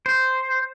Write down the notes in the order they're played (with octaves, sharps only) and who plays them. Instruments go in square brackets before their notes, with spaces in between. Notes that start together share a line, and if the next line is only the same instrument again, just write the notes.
[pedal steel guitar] C5